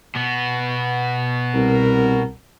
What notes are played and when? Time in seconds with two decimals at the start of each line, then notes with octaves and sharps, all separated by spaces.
0.15 B2 B3
1.54 C2 A#4